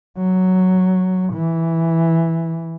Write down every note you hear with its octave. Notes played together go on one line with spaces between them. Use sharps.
F#3
E3